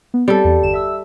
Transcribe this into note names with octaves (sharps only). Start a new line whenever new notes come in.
B3
G3 C4 A4
E2
G1 E7
E5 E6